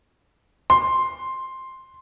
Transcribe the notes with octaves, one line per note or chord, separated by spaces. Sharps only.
C6